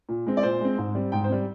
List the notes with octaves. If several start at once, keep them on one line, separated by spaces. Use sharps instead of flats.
A#2
G#3 C4
D5
A#2 C5
G#3 C4
G#2
G3 C4
G#2 G5
C5
G3 C4